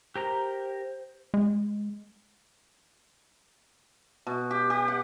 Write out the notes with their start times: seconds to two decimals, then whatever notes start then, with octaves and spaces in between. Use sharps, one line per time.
0.16 G4 A#4 C5 A#5
1.34 G#3
4.27 B2
4.51 G4
4.70 G4
4.88 F#5